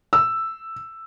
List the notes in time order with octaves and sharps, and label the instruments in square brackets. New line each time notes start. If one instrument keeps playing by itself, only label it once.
[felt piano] E6